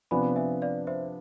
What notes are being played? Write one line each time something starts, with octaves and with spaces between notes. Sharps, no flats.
C3 F3 B3 D4 G#5 B5
E5 G#5
D5 F5
C5 E5